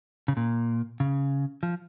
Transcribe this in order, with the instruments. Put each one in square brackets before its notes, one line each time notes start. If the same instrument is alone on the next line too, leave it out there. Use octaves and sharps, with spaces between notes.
[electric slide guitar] C#3
A#2
C#3
F3